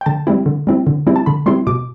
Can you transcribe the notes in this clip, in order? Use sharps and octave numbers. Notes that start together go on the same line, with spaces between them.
G5
D3 A5
G3 C4 E4
D3
G3 C4 E4
D3
G3 C4 E4
A5
D3 B5
G3 C4 E4 C6
B2 D6